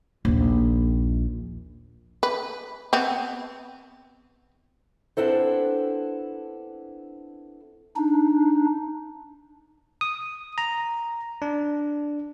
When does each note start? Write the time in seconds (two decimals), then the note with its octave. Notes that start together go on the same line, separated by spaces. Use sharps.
0.25 A#1 D#2
2.23 B4
2.93 B3 C4
5.17 B3 C4 D4 E4 A4 C5
7.96 D4 D#4
10.01 D#6
10.58 A#5
11.42 D4